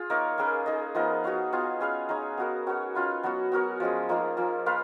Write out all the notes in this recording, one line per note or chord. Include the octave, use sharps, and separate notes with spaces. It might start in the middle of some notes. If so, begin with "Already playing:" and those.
Already playing: F4 G#4
A#3 D#4 A#4 C#5
A#3 C#4 G#4 B4
D#4 G#4 D#5
F3 B3 D#4 A#4
B3 F#4 C#5 F5
B3 F4 G#4 D#5
C#4 G#4 B4 F5
D#4 G#4 C#5
B3 F#4 A#4
C#4 F#4 C#5
C#4 F4 B4
F#3 B3 F#4 C#5
B3 F#4 A#4 C#5
F3 G#3 C#4 G#4
F3 A#3 D#4 G#4
F3 A#3 C#4
A#3 F4 B4 F5